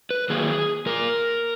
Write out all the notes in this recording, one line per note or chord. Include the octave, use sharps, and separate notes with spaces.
B4
D#3 F#3 A#3 G#4
A#2 A#3 A#4